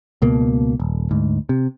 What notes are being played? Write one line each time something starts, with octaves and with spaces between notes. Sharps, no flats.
C#2 B2 A#3
D#1
D2 G#2
C3